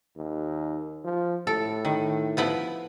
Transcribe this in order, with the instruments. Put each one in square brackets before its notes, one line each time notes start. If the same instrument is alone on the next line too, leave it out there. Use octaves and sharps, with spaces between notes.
[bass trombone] D#2
F3
[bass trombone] A2 [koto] A4
[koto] D#3
F3 B3 E4